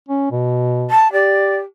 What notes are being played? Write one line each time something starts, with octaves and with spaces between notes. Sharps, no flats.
C#4
B2
A5
G4 D5